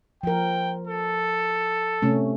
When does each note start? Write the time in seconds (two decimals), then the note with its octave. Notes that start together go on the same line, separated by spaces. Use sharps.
0.23 F3 A#4 G5
0.87 A4
2.02 C3 A3 C#4